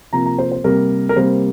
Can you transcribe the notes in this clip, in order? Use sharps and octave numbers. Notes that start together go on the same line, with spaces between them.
C3 F3 A#3 A#5
A#5
C5
C5
C3 G3 A#3 A#4
A#4
C3 G3 A#3 C5